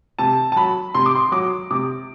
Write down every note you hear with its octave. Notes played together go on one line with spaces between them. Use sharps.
C3 A5
A5
F#3 B5
C3 C6
D6
C6
F#3 D6
C3 D6